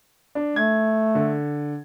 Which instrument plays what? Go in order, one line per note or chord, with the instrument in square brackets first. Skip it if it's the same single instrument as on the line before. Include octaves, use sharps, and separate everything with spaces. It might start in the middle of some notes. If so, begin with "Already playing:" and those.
[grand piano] D4
[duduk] A3 [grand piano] G#6
[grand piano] D3